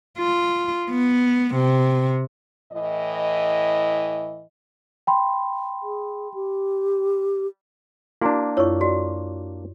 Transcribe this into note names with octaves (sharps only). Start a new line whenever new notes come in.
F4
B3
C3
A2 E3 D#5
G5 B5 C6
G#4
G4
A#3 D4 E4 F#4 G#5
F#2 E4 F4 C#5 C#6
F#4 D5